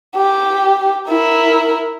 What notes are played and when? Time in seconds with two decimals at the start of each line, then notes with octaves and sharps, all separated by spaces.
0.16 G4
1.09 E4 A#4